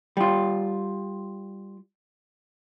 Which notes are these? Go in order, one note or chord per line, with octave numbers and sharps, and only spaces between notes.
G3 F4